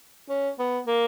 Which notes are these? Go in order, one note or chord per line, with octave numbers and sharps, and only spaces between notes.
C#4
B3
A#3